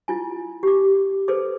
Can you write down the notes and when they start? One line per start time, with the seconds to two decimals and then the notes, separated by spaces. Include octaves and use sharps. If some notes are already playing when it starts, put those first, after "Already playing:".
0.08 E4 F4 G#5
0.63 G4 D6
1.28 G#4 A4 B4 C5 D6